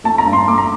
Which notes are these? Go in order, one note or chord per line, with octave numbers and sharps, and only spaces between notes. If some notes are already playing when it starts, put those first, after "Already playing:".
A3 A5
A#5
G2
C6
A3 D6
A#5